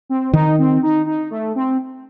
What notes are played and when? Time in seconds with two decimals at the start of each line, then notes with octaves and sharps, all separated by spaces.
0.10 C4
0.33 D#3 D#4
0.58 C4
0.82 D#4
1.06 D#4
1.30 A3
1.55 C4